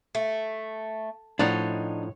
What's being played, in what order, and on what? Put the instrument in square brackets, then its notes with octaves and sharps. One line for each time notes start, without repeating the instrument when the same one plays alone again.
[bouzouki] A3
[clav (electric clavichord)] A2 F3 F#5 [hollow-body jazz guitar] D4 D#4 [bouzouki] C#5